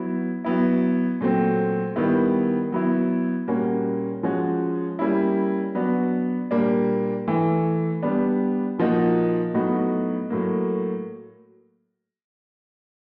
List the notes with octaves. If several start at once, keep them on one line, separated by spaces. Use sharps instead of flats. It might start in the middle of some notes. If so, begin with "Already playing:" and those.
Already playing: F#3 B3 E4
F#3 B3 E4
A#2 F#3 A3 C4
D#3 G3 B3 E4
F#3 B3 E4
A#2 G3 A#3 C#4 F#4
F3 G#3 C#4 F#4
G3 A#3 C#4 E4
F#3 B3 D4 F#4
A#2 G3 A#3 D4
A2 E3 A3
G3 B3 D4
A#2 F3 A#3 D#4 F#4
A2 F#3 B3 D#4 F#4
A2 F#3 A#3